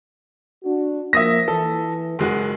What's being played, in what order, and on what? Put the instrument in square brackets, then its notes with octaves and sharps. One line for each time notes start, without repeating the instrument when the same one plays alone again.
[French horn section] D4 F#4
[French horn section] F3 A#3 [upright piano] E5 D#6 A#6
[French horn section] E3 [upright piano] A4
[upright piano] F#1 G#3 F#4 [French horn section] G#4